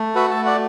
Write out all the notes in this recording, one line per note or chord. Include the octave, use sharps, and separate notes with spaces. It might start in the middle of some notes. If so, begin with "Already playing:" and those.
Already playing: A3
F#4 B4 E5
E5 A5
A3
D5 F#5